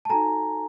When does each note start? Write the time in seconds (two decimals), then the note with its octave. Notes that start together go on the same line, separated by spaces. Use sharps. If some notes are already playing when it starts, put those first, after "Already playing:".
0.05 A5
0.09 D#4 F#4 A4 G#5 A#5